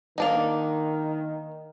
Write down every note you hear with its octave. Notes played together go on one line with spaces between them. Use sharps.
D#3 A#3 D4 D#4